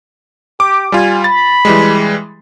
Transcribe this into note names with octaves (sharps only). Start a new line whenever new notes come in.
G4 D6
G3 F4 G#5
B5 A6
E3 G3 G#3